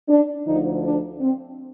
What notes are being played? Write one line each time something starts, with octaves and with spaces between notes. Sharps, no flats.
D4
D2 D3 F3 D#4
D4
C4